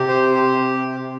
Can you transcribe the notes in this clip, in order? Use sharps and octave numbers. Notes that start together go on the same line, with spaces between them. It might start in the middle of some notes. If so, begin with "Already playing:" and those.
Already playing: C3 G4
C5
G4